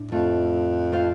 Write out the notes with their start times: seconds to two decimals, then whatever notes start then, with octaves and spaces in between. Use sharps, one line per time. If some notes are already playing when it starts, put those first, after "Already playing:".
Already playing: A2 D4
0.12 F2 A3 C4 F4
0.92 A3 C4 F4 C5 F5